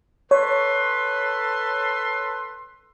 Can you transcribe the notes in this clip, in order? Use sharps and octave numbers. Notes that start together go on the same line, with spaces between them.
A4 B4 C#5 C6